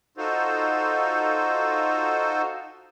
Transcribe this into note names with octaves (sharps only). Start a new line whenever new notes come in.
D#4 F4 F#4 A4 C5